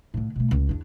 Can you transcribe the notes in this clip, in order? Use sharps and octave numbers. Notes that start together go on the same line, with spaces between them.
A2 D3
B2 A3
C#2
E2 D4